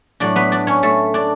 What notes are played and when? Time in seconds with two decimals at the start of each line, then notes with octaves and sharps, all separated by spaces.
0.20 A2 F#3 A3 D4 D5
0.36 B3 B4
0.52 D4 D5
0.67 C#4 C#5
0.83 A3 A4
1.14 D4 D5